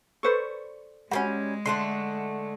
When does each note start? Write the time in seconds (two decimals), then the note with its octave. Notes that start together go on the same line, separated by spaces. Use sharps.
0.23 A4 B4 C5 D5 C#6
1.11 G3 G#3 A#3 C#4 F#4
1.66 D3 A3 F#5 C6